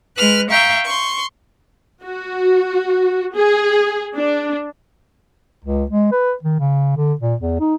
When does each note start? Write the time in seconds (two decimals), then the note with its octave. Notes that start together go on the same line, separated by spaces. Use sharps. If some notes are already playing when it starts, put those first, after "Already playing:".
0.16 G#3 B4 F6 F#6
0.49 E5 F5 G5 A#5 C#6
0.85 C6 C#6
2.03 F#4
3.36 G#4
4.17 D4
5.64 C#2
5.90 G#3
6.12 B4
6.43 D#3
6.59 C#3
6.96 D3
7.21 A#2
7.40 E2
7.60 D#4